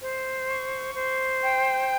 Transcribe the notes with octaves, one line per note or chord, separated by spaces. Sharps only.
C5
C#6
C5
G5